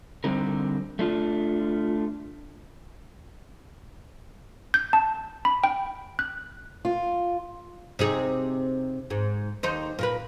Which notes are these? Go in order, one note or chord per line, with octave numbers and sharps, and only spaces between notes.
D3 G3 C4 D#4 A#4
A3 D4 F4
G6
A5
B5
G5
F#6
F4
C3 D#4 G#4
G#2
D#2 D#4 C5
A#2 A#4 B4